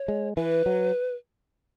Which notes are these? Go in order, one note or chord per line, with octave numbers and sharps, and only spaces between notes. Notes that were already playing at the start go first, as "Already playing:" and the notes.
Already playing: C#5
G#3
E3 B4
F#3